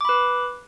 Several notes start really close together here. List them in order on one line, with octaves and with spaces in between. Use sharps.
D6 B5 B4